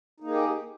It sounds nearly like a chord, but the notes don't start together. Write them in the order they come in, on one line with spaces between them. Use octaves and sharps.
D#4 A#3 G#4 G4